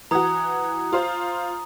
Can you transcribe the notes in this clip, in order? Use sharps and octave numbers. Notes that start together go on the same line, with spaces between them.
E3 F#4 A#5 D#6
F4 C5